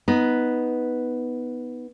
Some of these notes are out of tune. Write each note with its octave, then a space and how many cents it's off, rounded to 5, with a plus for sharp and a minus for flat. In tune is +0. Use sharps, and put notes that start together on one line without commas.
B3 +0 D#4 +10